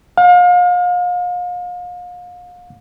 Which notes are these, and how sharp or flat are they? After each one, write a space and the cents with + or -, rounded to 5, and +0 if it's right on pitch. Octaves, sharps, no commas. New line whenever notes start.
F5 +35